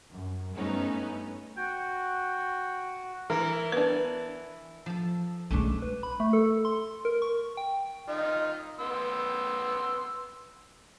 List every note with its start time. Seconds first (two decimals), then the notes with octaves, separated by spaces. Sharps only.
0.12 F#2
0.56 G2 A3 B3 C#4 D#4
1.57 F#4 G5
3.30 E3 A#4
3.72 B3 D4 B4
4.86 F3 A4
5.51 B1 G#3 A3 C#4 D4
5.82 B4
6.03 B5
6.20 A3
6.33 A4
6.65 C6
7.05 A#4
7.22 C#6
7.57 G5
8.09 D#4 F4
8.80 B3 C6 E6